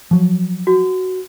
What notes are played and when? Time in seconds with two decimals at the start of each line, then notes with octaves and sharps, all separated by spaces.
0.11 F3 F#3
0.67 F#4